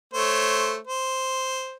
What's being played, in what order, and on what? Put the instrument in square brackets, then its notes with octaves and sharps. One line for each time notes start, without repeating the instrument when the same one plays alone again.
[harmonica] A3 C5 C#5
C5